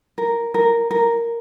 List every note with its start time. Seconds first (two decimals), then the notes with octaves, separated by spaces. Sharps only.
0.18 A#4
0.54 A#4
0.91 A#4